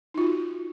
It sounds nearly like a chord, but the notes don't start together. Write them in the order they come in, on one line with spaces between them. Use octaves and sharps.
D#4 F4 F#4